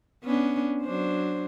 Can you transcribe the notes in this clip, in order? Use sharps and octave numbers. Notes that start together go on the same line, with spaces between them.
B3 C#4 D4
F#3 D4 C5